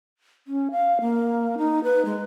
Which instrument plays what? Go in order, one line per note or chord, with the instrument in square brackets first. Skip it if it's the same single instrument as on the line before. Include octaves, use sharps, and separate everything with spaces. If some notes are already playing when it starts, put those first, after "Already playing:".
[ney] C#4
F5
A#3
D#4
B4
G#3